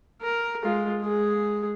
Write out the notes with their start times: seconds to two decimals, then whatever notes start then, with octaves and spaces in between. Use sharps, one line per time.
0.22 A#4
0.63 G#3 F4
1.02 G#3 G#4